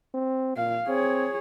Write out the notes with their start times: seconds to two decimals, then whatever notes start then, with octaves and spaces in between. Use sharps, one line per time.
0.14 C4
0.57 A#2 F5
0.88 C4 G#4 C#5